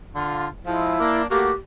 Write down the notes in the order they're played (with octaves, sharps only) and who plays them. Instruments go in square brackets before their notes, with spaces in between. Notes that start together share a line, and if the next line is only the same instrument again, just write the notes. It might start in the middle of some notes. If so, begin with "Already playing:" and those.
[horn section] D3 F4
[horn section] F3 G#3 [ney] E4
[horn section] A#3 D4
[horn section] A3 A#3 F#4 [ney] G4